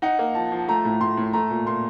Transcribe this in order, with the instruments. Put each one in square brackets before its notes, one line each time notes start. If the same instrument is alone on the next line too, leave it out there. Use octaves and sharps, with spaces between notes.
[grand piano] D#4 [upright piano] F#5
[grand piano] A#3
[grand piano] F3 [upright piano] A5
[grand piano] F3
[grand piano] A3 [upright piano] A#5
[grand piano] A2
[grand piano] A2 [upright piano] C6
[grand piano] A2
[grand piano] A3 [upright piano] A#5
[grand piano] A#2
[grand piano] A#2 [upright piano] C6